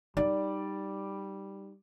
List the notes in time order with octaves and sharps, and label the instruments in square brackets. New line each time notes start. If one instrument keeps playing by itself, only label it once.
[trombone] G3 [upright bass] D#4 [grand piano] D5